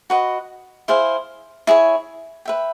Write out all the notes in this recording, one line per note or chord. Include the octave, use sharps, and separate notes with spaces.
F#4 B4 D#5
E4 G#4 C5 F5
E4 G#4 C#5
B4 E5 G5